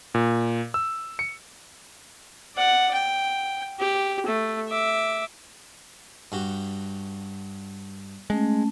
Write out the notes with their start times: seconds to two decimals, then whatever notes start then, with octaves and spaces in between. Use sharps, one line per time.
0.14 A#2
0.74 E6
1.19 C#7
2.56 D5 F#5
2.94 G5
3.79 G4
4.26 A3
4.68 E5 D6
6.32 G2 F#4 G4
8.30 G#3 A3 C#4 A5